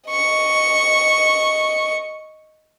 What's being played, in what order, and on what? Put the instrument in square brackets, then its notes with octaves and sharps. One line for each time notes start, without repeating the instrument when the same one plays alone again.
[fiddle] D#5 C#6